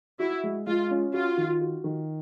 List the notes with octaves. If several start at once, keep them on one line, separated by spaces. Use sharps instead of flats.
E4 F#4
G#3
G#3 F4
C#4
F4 F#4
D#3
F#4
D#3